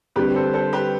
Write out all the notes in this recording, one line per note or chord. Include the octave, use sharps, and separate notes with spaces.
D3 G3 C4 G4 B4
A4 C5
A4 C5
G4 B4